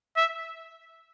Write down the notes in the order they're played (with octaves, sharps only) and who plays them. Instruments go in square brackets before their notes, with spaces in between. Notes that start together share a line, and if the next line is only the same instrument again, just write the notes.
[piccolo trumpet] E5